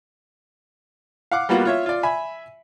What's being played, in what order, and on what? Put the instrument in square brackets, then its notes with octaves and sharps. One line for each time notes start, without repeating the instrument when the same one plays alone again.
[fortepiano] F5 F#5 D6
G3 A#3 B3 F4 F#4
F4 C#5 E5
F4 D5
E5 G#5 B5